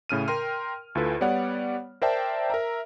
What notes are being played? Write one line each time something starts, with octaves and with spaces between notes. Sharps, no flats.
A2 C#3 F6 D#7
A#4 G5 C6 F6
D2 E4 F4 A4 B4
G3 B3 C#5 D5 F#5
A#4 C5 D5 E5 G5 A5
A#4 E5 A#5